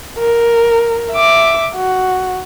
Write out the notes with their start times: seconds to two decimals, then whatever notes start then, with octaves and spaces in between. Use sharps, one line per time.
0.19 A#4
1.12 E5 D6
1.75 F#4